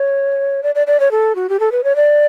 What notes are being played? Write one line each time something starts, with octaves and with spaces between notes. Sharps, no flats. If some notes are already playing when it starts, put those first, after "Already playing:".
Already playing: C#5
D5
D5
D5
C#5
A4
F#4
G4
A4
B4
C#5
D5